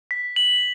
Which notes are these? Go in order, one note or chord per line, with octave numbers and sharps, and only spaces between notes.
B6
F#7